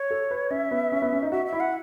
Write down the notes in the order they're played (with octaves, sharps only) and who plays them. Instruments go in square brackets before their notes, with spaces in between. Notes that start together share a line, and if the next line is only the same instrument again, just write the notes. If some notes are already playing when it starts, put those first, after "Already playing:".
Already playing: [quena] C#5
[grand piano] A4
B4
[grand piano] C#4 [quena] E5
[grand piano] B3
C#4
B3
C#4
D#4
[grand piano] F#4 [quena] E5
[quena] E5
[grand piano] E4
[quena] F#5